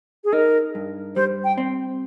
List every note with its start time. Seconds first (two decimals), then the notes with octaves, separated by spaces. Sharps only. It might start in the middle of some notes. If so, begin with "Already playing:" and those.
0.24 G#4
0.33 D#4 A#4
0.75 G2
1.16 G3 C5
1.44 G5
1.58 C4